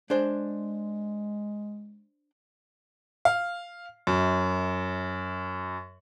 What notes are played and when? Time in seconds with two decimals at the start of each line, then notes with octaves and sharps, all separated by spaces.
0.10 G#3 D4 G#4 C5
3.25 F5
4.07 F#2